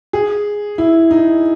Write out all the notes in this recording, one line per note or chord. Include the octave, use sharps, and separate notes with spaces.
G#4
E4
D#4